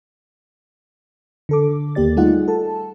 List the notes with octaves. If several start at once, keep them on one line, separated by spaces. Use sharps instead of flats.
D3 A4 D6
D#2 A#3 G4 D5 A6
G3 A3 D#4 F4 G#4 F#5
A4 A5